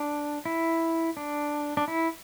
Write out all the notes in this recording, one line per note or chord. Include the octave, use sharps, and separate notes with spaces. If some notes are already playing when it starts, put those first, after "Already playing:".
Already playing: D4
E4
D4
D4
E4